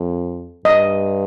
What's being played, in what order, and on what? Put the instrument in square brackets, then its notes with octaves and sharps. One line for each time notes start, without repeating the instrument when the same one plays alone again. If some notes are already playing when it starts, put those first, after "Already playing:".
Already playing: [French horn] F2
[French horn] G2 [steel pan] D#5